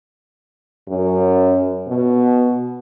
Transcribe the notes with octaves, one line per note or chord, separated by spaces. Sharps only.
F#2
B2